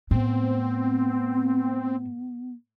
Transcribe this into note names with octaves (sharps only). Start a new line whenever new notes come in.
A2 B3 C4